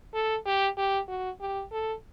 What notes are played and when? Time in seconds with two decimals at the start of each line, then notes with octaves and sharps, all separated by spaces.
0.14 A4
0.46 G4
0.77 G4
1.08 F#4
1.40 G4
1.71 A4